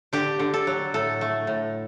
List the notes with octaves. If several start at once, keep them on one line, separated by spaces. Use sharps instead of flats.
D3 G4
D3
A4
F#3
A2 A4
A3
A2